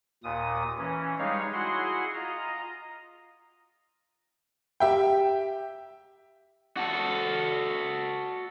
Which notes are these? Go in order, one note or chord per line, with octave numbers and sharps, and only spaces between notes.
D#2 A#2 D#6
E3 C#4
G3 G#3 D#4 G#4 C#5 F5
E4 F#4 G#4 F#5 C6
F4 D#5 A#5
G4 E5 G5
F#4 A4